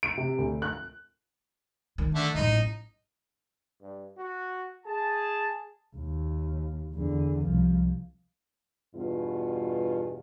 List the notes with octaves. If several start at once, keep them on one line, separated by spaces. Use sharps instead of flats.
D7
C3
D2
F#6
D#3
D3 A3
A1 F#3 D#4
G2
F#4
G#4 A5
D#2
E2 D3
C2 F3
E2 G2 B2 F4